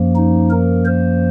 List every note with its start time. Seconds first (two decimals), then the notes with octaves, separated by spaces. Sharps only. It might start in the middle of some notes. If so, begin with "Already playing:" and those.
Already playing: F#2 F3 A#3
0.16 D#4
0.51 A#4
0.85 C5